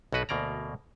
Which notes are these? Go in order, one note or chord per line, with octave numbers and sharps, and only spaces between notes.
B1 B2 F#4 B4
D2 B2 A#3 D5 A#5